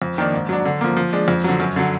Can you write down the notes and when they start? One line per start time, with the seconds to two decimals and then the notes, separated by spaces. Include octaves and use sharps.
0.02 F2
0.18 D#3 A#3 D4
0.33 G#2
0.49 F#3 D4
0.65 D3
0.81 F3 A#3
0.97 F3
1.13 G#3 D4
1.28 F2
1.44 D3 F#3
1.60 F#2
1.76 D3 F#3